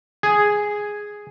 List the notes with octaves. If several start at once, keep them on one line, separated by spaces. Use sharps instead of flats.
G#4